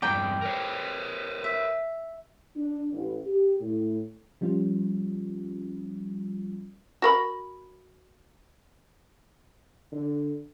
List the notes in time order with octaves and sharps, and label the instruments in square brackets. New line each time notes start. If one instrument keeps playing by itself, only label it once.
[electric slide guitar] E2 G2 [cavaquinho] D5 G5 A#5
[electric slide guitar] A#4 B4 C#5
[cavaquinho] E5
[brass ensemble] D4
A1
G4
A2
[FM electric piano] F3 G3 C#4 F4
[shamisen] F#4 A#4 B5
[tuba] D3